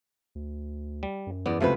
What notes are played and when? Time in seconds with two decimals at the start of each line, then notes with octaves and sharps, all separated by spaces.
0.35 D2
1.03 G3
1.27 F#2
1.46 E2 B3 D5
1.61 C#2 C3 A3 F4 F#4 B4